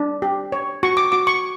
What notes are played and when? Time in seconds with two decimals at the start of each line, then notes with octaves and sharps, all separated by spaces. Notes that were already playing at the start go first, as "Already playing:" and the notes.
Already playing: D4
0.22 G4
0.52 C#5
0.83 F#4 C#6
0.97 D6
1.12 F#4 D6
1.27 C#6